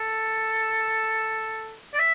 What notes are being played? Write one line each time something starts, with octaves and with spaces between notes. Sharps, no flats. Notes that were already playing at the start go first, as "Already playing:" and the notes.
Already playing: A4
D5
E5